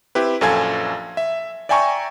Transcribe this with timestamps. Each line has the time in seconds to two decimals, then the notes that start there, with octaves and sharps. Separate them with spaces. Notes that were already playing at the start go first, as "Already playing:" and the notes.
0.15 C4 E4 G4 B4
0.41 A#1 F#2 A4 F5 G#5 G#6
1.17 E5
1.69 D5 E5 G5 G#5 A#5 C#6